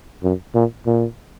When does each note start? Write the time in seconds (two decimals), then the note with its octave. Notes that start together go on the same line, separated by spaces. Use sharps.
0.23 F#2
0.55 A#2
0.86 A#2